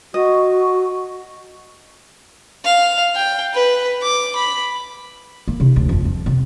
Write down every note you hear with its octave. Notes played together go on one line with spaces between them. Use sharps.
F#4 D#5
F5
G5
B4
D6
B5
A#3
C3 D#4
D2
G1 F2
F2
C3